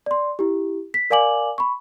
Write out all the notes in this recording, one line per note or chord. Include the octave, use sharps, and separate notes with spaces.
D5 C6
E4 G4
B6
A#4 D5 F5 G#5 D6 F#7
B5 C#6